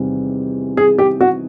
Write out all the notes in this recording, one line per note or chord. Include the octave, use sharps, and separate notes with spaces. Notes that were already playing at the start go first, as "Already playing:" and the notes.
Already playing: E2 C3 D#3 G3
G#4
G4
F#4